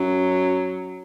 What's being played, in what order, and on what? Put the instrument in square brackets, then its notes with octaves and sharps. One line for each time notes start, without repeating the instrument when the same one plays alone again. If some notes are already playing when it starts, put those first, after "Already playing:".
Already playing: [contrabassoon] F#2 [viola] F#3